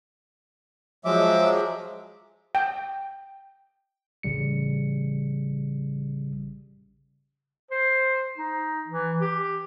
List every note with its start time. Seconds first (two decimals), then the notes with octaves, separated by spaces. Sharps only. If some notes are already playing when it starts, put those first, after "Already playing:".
1.05 F3 F#3 G#3 E5 D6
2.55 G5
4.23 A1 C#3 G3 C#7
7.71 C5
8.37 D#4
8.88 E3
9.21 G4